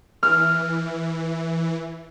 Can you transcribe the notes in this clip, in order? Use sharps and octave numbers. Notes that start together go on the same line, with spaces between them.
E3 F6